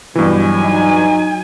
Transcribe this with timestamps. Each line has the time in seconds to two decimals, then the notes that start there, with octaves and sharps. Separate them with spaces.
0.15 G2 B2 E3 F#3 G#5
0.62 D#4